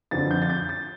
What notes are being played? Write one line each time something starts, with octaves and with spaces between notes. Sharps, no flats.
F2 D3 F3 C4 A6
G6
A6
G6
A6